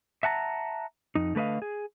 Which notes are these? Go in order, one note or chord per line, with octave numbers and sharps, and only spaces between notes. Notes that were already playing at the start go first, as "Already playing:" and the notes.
E5 F#5 A5 A#5
F2 D#4
D3 A3 B4 D#5 F5
G#4